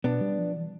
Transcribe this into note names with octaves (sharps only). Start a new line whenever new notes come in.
B2 B3 D4
G3
F3
E3